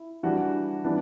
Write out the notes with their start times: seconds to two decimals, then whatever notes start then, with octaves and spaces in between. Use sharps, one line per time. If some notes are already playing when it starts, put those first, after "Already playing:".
Already playing: E4
0.23 E3 G3 D4 F#4
0.84 E3 G3 B3 D4